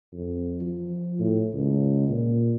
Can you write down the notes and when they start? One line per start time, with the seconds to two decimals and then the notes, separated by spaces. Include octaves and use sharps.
0.13 F2
0.61 F3
1.19 A2
1.53 C#2
2.09 A#2